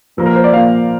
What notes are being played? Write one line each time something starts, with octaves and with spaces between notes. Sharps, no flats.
A#2 F3 A#3
A#4
C5
D5
A#2 F3 A#3 F5